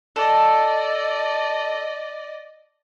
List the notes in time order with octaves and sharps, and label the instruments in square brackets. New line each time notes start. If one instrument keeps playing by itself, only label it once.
[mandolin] A4 [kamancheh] D5 D#5